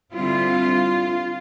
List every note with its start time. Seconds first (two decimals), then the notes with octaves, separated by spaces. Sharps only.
0.13 D3 G3 C4 E4 F4